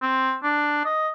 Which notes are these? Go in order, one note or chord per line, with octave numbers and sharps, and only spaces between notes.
C4
D4
D#5